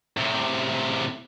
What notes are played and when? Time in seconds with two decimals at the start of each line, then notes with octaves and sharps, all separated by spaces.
0.17 A2 C3